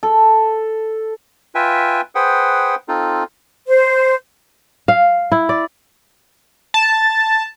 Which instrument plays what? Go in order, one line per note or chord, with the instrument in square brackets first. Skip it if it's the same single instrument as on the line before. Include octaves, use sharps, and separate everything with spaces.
[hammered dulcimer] A4
[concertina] F4 B4 E5 G5 G#5
G#4 B4 C5 F#5 G5
C4 D#4 F4 A4
[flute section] C5
[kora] F5
E4
D5
[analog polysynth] A5